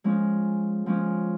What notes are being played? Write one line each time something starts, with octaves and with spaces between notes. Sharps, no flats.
F3 G#3 C#4
F3 G#3 C#4